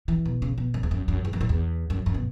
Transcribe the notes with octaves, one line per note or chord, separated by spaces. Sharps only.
E3
B2
C#3
B2
F#2
E2
F#2
F#2
E2
F#2
A2
E2
F#2
F#2
B2